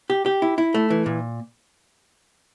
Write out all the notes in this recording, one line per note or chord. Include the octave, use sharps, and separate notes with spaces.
G4
G4
E4
E4
A3
E3
A#2